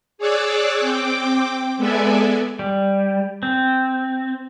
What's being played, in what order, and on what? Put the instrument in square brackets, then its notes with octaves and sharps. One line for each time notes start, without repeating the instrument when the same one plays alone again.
[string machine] G#4 C#5 D5 D6 E6 F#6
C4 G5 D6
G#3 B3 A4 D5 E5 G#5
[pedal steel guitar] G3
C4